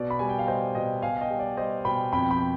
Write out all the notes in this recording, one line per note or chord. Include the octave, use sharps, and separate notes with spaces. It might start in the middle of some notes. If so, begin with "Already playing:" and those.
Already playing: B2 D5
B5
G3 G#5
G5
F5
G3 C5 D#5
B2 D#5 G5
B2 F5 G#5
D#5 G5
G3
D5
G3 C5 D#5
B2 G5 B5
F2 G5 B5
G5 B5